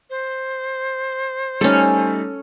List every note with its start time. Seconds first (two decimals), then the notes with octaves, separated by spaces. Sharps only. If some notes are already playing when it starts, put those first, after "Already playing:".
0.10 C5
1.61 G3 A3 C#4 D#4 A4